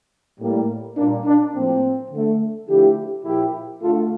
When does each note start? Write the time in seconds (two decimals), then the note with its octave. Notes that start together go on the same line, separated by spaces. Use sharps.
0.39 A2 G3 A#3
0.96 A#2 G3 A#3 D4
1.25 D4
1.54 A2 F3 A#3 C4
2.10 D3
2.16 A3
2.68 D3 F3 A3 E4 G4
3.24 A#2 F3 A#3 E4 G4
3.82 D3 A3 F4 A4